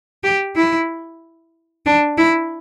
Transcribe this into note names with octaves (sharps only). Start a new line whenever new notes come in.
G4
E4
D4
E4